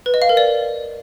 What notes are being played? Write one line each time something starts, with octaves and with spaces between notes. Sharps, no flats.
B4
D#5
F5
A#4
D5